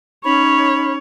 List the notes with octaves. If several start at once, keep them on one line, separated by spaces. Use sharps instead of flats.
C#4 D#4 C#5 B5